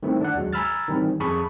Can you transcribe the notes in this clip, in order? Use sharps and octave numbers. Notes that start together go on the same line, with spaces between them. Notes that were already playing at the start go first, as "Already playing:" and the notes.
D#3 G3 A3 C4 E4
D4 D5 F#5
D#2 F#3 G#3
G#5 A#5 B5 E6 F6 A6
D#3 E3 G3 C4
F2 G#4 A5 B5 C#6 D#6